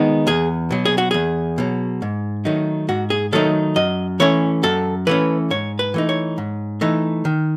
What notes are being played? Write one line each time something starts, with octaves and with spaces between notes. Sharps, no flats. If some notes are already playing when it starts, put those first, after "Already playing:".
Already playing: D#3 G#3 B3 D#4
E2 G#4
B2 F#3
G#4
F#4
E2 G#4
B2 F#3
G#2
D#3 F#3 A3 D#4
G#2 F#4
G#4
D#3 F#3 A3 D#4 A4
F#2 D#5
E3 A3 C#4 C#5
F#2 A4
E3 A3 C#4 B4
G#2 C#5
B4
E3 A3 D#4
C#5
G#2
E3 A3 D#4
D#3